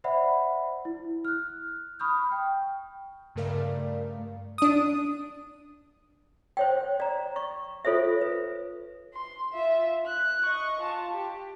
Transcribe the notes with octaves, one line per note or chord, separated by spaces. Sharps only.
C5 D5 E5 F#5 B5
E4
F6 F#6
B5 C#6 D#6 F6 G6
G5
G2 C#3 A3 A#4 D5 F5
D4 D#6
C5 C#5 G5
D5 A#5
C#6
F4 A4 C5 C#5 E5
B4
C6
F4 E5
F#6
D#5 C#6
F4 A5
G4